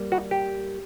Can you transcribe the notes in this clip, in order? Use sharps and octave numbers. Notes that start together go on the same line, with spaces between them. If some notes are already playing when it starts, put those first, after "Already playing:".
Already playing: G3 A#3
F#4
G4